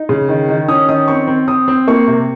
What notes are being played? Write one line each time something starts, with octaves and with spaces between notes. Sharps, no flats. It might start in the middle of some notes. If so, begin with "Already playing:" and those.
Already playing: D#4
C#3
D#3
D#3
C#4 D#6
D#3 D#6
C4 C#6
C4
C4 D#6
C4
A#3 C#6
C3